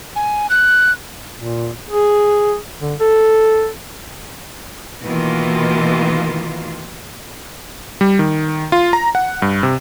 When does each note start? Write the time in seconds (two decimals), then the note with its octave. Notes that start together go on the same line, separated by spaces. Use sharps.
0.16 G#5
0.50 F#6
1.36 A#2
1.89 G#4
2.80 D3
3.00 A4
5.04 B2 D#3 E3 A3 A#3 F4
8.01 G3
8.19 D#3
8.72 F4
8.93 A#5
9.15 F#5
9.42 G2
9.63 C3